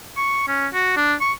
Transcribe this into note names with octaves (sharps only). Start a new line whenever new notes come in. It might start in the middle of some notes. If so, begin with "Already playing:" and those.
C#6
C#4
F#4
D4
C#6